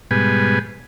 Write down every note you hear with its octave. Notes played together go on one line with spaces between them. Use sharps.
G#2 B2 G3 B4 G#5